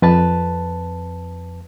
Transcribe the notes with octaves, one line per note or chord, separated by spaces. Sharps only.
F2 B4 A5